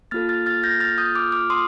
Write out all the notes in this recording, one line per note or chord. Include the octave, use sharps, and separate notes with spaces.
A#3 F4 A4 F6 A6
F6 A6
F6 A6
G6 A#6
F6 A6
D#6 G6
D6 F6
D6 F6
C6 D#6